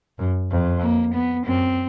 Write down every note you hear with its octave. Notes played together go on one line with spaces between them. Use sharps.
F#2
F2
A#3
B3
F#2 C4